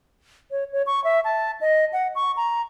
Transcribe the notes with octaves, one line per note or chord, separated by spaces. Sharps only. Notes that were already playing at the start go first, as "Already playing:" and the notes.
C#5
C#5
C#6
E5
A5
D#5
F#5
C#6
A#5